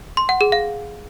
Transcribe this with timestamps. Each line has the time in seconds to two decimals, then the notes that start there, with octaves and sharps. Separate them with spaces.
0.17 C6
0.29 F#5
0.41 G#4
0.52 F5